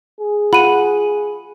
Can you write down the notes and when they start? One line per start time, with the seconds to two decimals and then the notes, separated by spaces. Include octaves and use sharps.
0.21 G#4
0.53 F4 F#5 B5 D#7